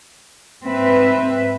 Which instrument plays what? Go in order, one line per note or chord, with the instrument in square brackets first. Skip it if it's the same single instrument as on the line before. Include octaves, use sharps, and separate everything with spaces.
[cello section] G#2 B4 E5 [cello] C4